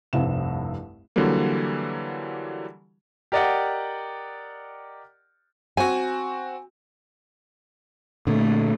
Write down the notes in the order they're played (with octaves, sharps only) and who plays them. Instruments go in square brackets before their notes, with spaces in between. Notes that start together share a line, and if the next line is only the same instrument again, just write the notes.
[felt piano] F1 C2 G2 C3 E7
[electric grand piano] D3 E3 F#3 G3 A#3
[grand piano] G4 A#4 D5 D#5 F#5 G5
[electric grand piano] C4 F#4 [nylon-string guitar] G#5
[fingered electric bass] A#2 D3 [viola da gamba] A3